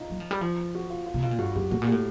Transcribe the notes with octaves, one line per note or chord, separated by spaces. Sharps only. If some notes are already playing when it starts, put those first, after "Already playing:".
Already playing: D#4 F4
F#3
F3
G3
F3
F#4
F4
F4
C3
B2 F4
A#2
G2 F#4
F#2 G4
A2 F#4
A#2
A2 G4